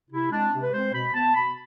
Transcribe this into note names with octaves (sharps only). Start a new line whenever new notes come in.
C3 E4
G#3 C4 D4
C3
B4
G#3 C4 C5
B2 B5
B3 A5
B2 B5